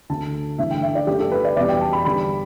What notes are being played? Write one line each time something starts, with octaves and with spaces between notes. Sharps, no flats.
D2 D3 A3 A5
A1 G2 D3 A3 E5
G5
E5
D5
G1 G2 D3 A3 G4
A4
B4
D5
E2 B2 G3 D5
G5
A5
B5
G1 G2 G3 B5